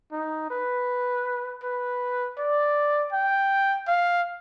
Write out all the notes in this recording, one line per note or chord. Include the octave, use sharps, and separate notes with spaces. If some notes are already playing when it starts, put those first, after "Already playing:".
D#4
B4
B4
D5
G5
F5